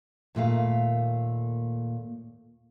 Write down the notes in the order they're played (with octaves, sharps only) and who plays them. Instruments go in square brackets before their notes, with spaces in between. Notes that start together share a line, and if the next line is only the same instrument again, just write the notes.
[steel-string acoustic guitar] D#2 A#2 A3 F5